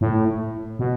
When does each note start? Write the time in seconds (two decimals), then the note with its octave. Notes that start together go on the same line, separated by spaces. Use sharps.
0.01 A2
0.79 B2